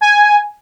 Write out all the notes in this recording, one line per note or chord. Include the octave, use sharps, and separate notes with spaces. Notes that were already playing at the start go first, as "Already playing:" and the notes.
G#5